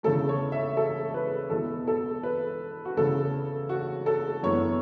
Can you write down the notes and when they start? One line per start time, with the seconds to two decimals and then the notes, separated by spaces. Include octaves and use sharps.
0.03 E2 C#3 A3 A4
0.29 C#5
0.52 E5
0.77 A4
1.14 B4
1.50 E2 B2 B3 A4
1.87 A4
2.23 B4
2.85 F#4
2.97 E2 C#3 A3 A4
3.69 F#4
4.06 A4
4.43 F#2 E3 B3 C#5